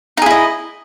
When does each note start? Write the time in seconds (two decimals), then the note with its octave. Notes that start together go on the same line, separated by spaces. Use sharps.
0.17 D#4
0.22 G#4
0.26 E4
0.31 D#5